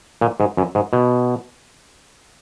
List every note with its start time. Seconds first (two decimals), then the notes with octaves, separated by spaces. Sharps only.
0.21 A#2
0.40 G#2
0.57 F#2
0.75 G#2
0.93 B2